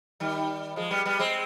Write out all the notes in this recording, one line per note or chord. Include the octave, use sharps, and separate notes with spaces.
D#3 G3
F3 G#3
G3 B3
G3 B3
G#3 C4